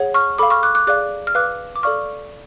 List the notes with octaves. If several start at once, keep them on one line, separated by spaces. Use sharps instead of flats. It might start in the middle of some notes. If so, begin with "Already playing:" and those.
Already playing: G#4 C#5 F#5
C#6 F6
A4 F5 B5 D6
C#6 F6
D6 F#6
D6 F#6
G#4 D5 F5 D6 F#6
F6
B4 F5 D6 F#6
D6
A4 D5 F5 C#6 F6